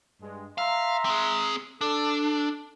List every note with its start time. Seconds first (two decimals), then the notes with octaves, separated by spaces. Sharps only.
0.22 G2 G#3
0.58 E5 F5 A#5 C6
1.05 C4 G#4
1.81 D4 A4